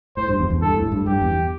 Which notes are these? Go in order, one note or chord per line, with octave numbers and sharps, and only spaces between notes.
A2 C5
G2
E2
E2
G2 A4
A2
G2
G2 G4
E2